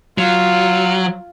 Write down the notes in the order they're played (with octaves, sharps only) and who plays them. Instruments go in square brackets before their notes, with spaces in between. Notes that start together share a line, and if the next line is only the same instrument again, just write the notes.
[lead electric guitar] F#3 [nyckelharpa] F4